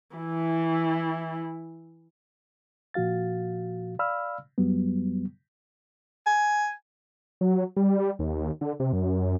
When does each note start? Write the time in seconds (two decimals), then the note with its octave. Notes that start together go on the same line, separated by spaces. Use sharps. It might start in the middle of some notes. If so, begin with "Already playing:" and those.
0.16 E3 E4
2.94 A#2 F3 F#4 F5 A6
3.99 D5 F5 B5 E6 F6
4.58 F#2 F#3 G3 B3
6.26 G#5
7.41 F#3
7.77 G3
8.19 D#2
8.61 D3
8.80 C3
8.93 F#2